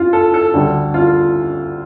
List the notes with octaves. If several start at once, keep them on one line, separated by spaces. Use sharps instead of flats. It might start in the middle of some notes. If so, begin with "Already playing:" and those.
Already playing: F4
A4
A4
D2 D3 G3
F4